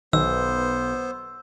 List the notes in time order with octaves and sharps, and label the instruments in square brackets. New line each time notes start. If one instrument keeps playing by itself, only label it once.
[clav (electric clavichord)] B1 [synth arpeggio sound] D#3 [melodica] B3 C5 [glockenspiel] E6